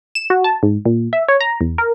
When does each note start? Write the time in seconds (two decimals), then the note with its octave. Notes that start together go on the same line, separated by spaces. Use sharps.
0.15 E7
0.30 F#4
0.44 A5
0.63 G#2
0.85 A#2
1.13 E5
1.28 C#5
1.41 A#5
1.61 E2
1.78 A#4